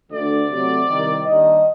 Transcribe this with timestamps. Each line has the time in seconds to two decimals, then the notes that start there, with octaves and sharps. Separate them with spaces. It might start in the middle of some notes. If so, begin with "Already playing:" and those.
0.11 D2 D3 A3 D5
0.50 C3 F#3 A3
0.88 C2 C3 D#3
1.26 D#2 D#3 G3 D4 D#5